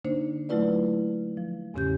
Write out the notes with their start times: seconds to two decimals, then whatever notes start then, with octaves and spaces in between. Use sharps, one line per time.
0.05 D3 A#3 D4 D#4 C5
0.49 F#3 A3 E4 F4 B4 D5
1.37 F3
1.74 E2 G#2 C#3 C#4 G4 G6